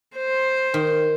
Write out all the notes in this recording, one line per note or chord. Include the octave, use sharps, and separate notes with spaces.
C5
D#3